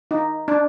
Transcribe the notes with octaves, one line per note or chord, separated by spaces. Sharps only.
D#4
D4